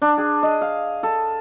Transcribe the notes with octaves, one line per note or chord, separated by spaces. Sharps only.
D4
G#4
D#5
F5
A4